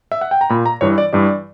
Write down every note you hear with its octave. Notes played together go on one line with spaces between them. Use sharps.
E5
F#5
G5
A#5
A#2 B5
A#5
G2 E3 C#5
D5
G2 E3 D5